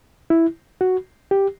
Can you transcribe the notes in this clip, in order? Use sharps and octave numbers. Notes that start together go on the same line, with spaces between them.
E4
F#4
G4